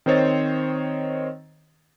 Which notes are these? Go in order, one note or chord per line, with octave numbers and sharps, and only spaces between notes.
D#3 C4 C5 C#5 D#5 A6